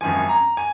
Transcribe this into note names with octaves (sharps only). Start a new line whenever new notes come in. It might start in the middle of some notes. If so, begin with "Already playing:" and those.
G#1 F#2 F3 G#5
A#5
G#5